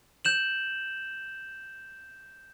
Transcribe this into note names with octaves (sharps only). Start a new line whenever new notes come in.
G6 E7 F#7